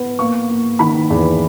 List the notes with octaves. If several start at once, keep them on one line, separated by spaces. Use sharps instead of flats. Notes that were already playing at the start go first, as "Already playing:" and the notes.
Already playing: B3
A#3 C#6
A#3
D#3 B5
E2